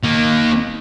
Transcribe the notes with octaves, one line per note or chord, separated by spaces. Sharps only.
D#3 A#3